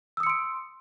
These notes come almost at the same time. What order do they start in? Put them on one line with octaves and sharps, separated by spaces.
E6 D#6 C#7 C6 D7